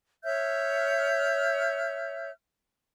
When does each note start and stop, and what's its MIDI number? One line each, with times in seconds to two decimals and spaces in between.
0.25 2.31 73
0.25 2.31 76
0.25 2.31 89
0.25 2.31 91